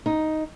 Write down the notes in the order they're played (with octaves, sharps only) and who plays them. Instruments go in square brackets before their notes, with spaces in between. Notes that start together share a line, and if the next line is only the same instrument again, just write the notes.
[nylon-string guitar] D#4